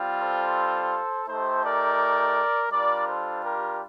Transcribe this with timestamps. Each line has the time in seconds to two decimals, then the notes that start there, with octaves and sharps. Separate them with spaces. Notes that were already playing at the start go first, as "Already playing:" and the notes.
Already playing: G3 C4 F4
0.21 A4 C5
1.28 A3 D#4 G4 A4 C5
1.64 A#4 D5
2.71 G3 D4 F4 A#4 D5
3.07 A4 C5
3.43 G4 A#4